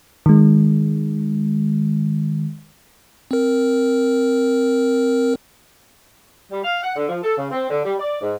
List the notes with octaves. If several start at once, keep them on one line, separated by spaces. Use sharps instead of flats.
D#3 G#3
C4 A#4
G3
F5
F#5
D3
F3
A4
C#3
C4
D3
G3
D5
G#2